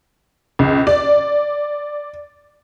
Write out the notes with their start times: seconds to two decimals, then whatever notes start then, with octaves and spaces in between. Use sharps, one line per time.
0.59 C#2
0.87 D5